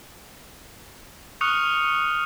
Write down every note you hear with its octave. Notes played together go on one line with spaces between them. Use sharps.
C#6 D#6 F6 F#6 C#7 F7